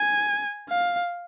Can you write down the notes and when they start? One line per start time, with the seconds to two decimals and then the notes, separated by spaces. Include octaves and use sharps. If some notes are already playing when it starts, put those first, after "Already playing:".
Already playing: G#5
0.70 F5